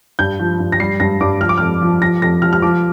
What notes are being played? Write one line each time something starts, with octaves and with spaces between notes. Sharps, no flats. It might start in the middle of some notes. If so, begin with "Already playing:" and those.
G2 G6
F3
G2
A#6
G3 C7
G2 A#6
G2 D6
F3 F6
D6
F2 F6
F3
F3 A#6
F2 A#6
F3 F6
F6
F3 D6